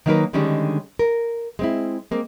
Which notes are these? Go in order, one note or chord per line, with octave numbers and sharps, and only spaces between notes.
D#3 F#3 A#3 D#4 A#4 B4
D3 D#3 G3 G#3 C#4 D4
A#4
G#3 C4 E4
G#3 A#3 C4